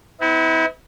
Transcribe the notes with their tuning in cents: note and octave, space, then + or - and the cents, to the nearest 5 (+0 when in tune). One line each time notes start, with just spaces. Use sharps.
B3 +40 E4 -35